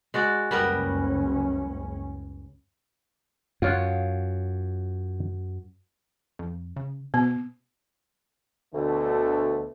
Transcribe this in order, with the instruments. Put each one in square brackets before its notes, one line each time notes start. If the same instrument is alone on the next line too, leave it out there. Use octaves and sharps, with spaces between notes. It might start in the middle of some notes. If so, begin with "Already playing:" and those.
[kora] G#3 F#4 D5
[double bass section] F#1 C#2 C#4 [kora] G3 B3 A#4
[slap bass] F#2 [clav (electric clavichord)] F4 C#5 F#5
[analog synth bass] F2
C#3
[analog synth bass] B2 [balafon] B3
[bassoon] D2 [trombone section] B2 D3 A3